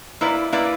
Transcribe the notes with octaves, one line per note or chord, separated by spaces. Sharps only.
A#3 E4 B4 D5
A#3 E4 B4 D5